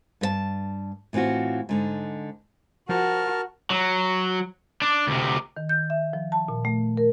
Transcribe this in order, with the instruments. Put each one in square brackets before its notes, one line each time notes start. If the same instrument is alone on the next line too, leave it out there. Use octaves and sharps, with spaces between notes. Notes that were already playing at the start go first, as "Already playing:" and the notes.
[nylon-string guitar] G2 B4 A5
A2 E3 C4 F4 F#4
G#2 D3 D#4
[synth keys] F3 [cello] F#4 [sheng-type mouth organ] A#4 A5 F6
[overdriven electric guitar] F#3
D4
D2 C3
[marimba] D#3
G6
E5
F3
A5
A#2
A3
A#4